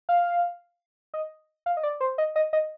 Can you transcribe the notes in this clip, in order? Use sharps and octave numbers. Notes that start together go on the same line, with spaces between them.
F5
D#5
F5
D#5
D5
C5
D#5
D#5
D#5